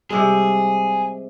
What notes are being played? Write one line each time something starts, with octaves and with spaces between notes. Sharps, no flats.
C3 G3 G#3 G#4